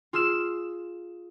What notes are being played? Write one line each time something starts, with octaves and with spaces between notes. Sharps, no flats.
F4 G#4 E6 F6 E7